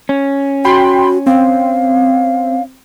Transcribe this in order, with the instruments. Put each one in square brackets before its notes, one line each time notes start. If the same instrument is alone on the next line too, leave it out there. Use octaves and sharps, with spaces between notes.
[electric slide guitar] C#4
[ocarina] F#4 [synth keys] G5 B5 C6
[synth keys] C4 [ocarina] F5